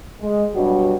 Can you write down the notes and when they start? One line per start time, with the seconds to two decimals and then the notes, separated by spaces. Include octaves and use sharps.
0.21 G#3
0.54 G2 B2 F#3 G3 D4 F#4